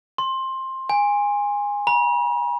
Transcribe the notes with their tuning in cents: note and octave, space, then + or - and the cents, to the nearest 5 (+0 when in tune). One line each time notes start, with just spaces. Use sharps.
C6 +15
G#5 -20
B5 -45